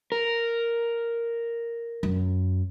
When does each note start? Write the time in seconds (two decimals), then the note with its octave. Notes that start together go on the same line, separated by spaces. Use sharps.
0.12 A#4
2.03 F#2